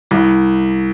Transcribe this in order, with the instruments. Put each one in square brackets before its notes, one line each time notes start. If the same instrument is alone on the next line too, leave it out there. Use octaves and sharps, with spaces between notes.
[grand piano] C2